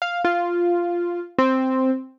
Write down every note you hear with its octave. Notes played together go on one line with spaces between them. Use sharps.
F5
F4
C4